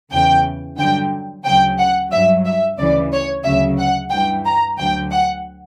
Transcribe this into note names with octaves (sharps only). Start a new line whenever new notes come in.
E2 C#3 E3 G5
G2 D3 F#3 G5
D2 C#3 F#3 G5
F#5
G2 F#3 E5
E5
D2 C#3 E3 D5
C#5
D2 C#3 F#3 E5
F#5
G2 E3 G5
A#5
D2 D3 F#3 G5
F#5